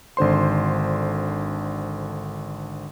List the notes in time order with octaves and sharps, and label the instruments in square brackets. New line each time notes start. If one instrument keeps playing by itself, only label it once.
[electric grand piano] G#1 D3 C5 C6